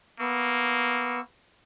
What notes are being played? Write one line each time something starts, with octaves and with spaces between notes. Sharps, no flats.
A#3 B3 C#6 E6